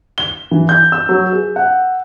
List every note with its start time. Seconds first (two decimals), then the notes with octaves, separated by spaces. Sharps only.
0.18 G7
0.51 E3
0.69 G6
0.92 E6
1.09 F#3
1.33 G#4
1.56 F#5